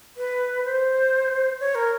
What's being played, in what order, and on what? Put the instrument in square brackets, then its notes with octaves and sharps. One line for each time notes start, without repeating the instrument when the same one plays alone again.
[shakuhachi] B4
C5
C#5
A#4